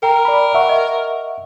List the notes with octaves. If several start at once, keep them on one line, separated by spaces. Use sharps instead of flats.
A#4 G5 A#5
D5 B5
E5 F#5 C#6
D#5